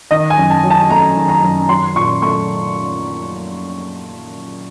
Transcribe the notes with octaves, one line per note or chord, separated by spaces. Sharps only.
D#3 D#5
G#5
F#2
A5
F#3
A5
A3 A#5
D#3
A#5
F#2
F#3 C6
A#2 C#6
A3 C#6